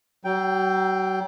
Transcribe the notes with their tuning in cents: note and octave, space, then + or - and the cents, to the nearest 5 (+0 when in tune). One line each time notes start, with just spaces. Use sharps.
F#3 +40 G5 +0